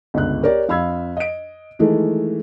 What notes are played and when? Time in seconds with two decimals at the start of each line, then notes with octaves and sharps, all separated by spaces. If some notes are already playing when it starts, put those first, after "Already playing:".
0.14 G1 C#2 F#6
0.43 G4 A#4 C#5 D5
0.68 F2 F5 B5 E6 G#6
1.17 D#5 D7
1.79 D#3 E3 G#3 A3